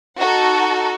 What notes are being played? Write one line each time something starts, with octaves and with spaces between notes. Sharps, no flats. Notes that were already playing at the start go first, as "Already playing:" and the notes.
D#4 F#4 A4 F#5 A#5